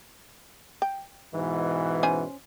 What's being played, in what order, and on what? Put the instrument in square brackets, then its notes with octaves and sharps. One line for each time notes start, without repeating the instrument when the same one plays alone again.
[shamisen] G5
[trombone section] G#2 B2 E3
[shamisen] C#4 C5 G#5